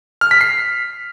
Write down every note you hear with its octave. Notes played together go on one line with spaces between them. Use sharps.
F6
B6
C7